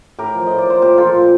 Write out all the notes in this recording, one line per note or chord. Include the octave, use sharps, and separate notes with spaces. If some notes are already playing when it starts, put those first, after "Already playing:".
A2 G4 A#4
F3
A2 D#5
D5
F3 C5
A#2 G4 A#4
F3 F4 A4
A#2